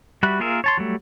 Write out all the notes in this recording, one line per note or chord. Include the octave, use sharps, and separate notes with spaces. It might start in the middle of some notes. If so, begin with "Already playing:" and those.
G3 F#4 E5 B5 F#6
A#3 F4 G#4 A#4 E5
C#5 A5 C6
F#3 G3 A3